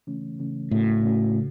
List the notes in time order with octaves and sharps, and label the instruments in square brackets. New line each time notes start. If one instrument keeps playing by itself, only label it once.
[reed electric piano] C#3 E3 A3 C#4
C#3 E3 A3 C#4
[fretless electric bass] A2 [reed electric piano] C#3 A3 C#4 F#4
[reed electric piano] C#3 A3 C#4 F#4
C#3